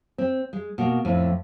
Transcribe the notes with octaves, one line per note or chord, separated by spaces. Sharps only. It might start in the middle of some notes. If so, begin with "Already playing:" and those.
C4
G#3
B2 A#3
F2 A2